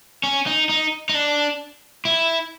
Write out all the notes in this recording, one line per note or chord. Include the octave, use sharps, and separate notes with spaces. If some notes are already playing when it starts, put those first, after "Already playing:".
C#4
D#4
D#4
D#4
D4
E4